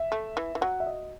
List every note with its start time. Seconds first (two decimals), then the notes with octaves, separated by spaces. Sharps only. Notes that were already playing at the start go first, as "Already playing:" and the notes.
Already playing: E5
0.12 A3
0.37 E3
0.55 E3
0.61 F#3 F#5
0.80 E5
0.87 D#5